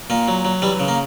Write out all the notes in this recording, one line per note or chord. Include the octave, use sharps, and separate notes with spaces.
A#2 A#3
F#3
F#3
E3 G3
C#3
A#3